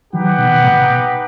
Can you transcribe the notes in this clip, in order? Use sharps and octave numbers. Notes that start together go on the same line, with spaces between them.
D#3 F#3 D#4 G4 B4 F#5
B2 D#3
B2
A2 C3
B2